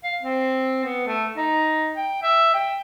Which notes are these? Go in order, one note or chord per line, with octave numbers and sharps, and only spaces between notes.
F5
C4
B3
A3
D#4
G5
E5
G5